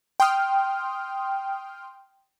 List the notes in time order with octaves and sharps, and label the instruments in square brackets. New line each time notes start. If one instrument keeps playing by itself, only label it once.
[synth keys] G5 C6 D#6 F6